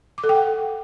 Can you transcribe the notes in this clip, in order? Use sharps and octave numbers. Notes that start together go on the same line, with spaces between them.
D6
A4
G5
F#5